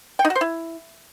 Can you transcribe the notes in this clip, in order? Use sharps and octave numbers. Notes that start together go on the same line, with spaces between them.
G5
D#4
F#4
C5
E4